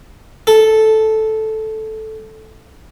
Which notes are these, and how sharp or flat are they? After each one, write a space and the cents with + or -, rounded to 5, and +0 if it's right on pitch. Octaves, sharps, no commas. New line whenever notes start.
A4 -5